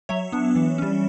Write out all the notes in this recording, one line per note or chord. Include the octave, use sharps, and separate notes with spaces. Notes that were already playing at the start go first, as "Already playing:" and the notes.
F#3 C#5 E5
B3 D4
E3
G3 C#4